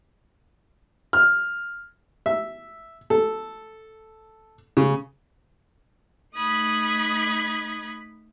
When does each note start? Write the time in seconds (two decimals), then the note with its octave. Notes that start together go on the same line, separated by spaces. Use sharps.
1.13 F6
2.26 E5
3.10 A4
4.77 C#3
6.35 A3 D#4 B5 D#6 F#6 G#6